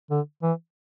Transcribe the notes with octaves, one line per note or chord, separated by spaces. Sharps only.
D3
E3